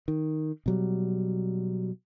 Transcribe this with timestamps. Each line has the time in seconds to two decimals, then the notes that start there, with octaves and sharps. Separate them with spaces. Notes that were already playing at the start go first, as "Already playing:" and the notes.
0.08 D#3
0.66 B2 F#3 G3